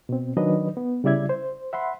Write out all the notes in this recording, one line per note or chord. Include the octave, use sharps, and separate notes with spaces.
B2 C4
D#3 F#3 D4 B4 D#5
B3
C#3 G3 E4 D5 E5 G#6
C5
E5 F#5 B5 C6